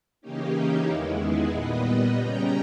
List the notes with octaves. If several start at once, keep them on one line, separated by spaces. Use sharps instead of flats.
C#3 E3 A#3 C#4 D#4 G4
E2 D#3 G#3 B3 E4
E4 G#4
A#2 G3 B3 B4 D#5
B4 D#5
C#3 G3 C#4 G5 A#5